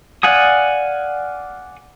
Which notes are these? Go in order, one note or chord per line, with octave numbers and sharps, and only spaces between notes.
D5 F5 F#5 G#5 D#6